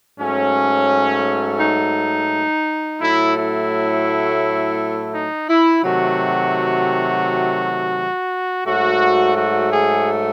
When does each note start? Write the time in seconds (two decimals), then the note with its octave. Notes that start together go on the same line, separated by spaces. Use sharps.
0.19 G#2 F#3 A3 C#4
1.59 D#4
3.01 A2 F#3 A3 E4
3.36 E4
5.13 D#4
5.48 E4
5.83 C3 D#3 F#3 A3 F#4
8.65 G#2 F#3 A3 F#4
9.36 F#4
9.72 G#4